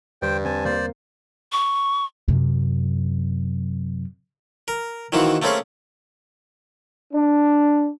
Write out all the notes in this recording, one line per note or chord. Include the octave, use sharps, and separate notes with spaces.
E2 G2 D3 G3 C5 G5
C4 G#5 A5
A#3 C5 D5
C#6
F#2 C3
A#4
D#3 E3 A#3 C4 F#4
A3 A#3 C4 C#4 G#4
D4